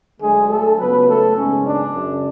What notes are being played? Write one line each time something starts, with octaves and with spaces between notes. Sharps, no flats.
D2 D3 F#3 G#3 A3 G#4
A3 A4
C#2 C#3 F#3 B3 B4
A3 A4
G#1 F#2 C#3 G#3 B3 C#4
D4
F#2 C#3 G#3